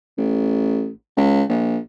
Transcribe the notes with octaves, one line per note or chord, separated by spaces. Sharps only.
A1
C#2
A#1